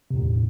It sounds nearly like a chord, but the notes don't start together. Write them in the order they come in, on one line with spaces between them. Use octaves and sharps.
C3 E2 A2